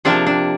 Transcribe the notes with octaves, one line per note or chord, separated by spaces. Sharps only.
C3 F3 A#3 D4
D4